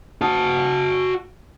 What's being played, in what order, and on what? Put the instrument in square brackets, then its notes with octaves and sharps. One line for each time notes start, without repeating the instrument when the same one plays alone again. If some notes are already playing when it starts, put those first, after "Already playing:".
[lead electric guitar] F#4 A5